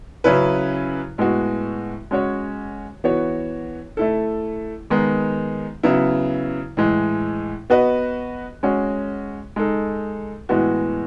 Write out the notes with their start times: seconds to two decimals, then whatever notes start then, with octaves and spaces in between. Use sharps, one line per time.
0.24 C#3 F#3 C#4 E4 B4
1.18 A2 G#3 B3 F#4
2.11 G#3 C#4 F#4 C#5
3.04 E3 B3 F#4 C#5
3.97 A3 E4 A4
4.90 D#3 G#3 B3 D#4
5.83 C#3 F#3 B3 E4
6.77 A2 E3 G#3
7.70 B3 F#4 B4 D#5
8.63 G#3 C#4 F#4
9.56 G#3 D#4 A4
10.49 A2 E3 G#3 B3 F#4